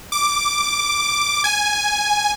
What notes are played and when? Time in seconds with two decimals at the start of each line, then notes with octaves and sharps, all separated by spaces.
0.12 D6
1.44 G#5